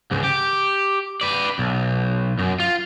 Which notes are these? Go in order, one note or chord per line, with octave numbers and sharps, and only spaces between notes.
C#2 G#2
G4
B4 D5
B1
F#2
F4